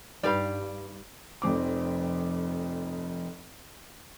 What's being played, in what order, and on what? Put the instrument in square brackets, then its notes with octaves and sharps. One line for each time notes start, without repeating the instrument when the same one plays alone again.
[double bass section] G2 [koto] G3 G4 F5 [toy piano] D#4 B4 B5 [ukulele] D5
[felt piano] F1 F2 C4 D6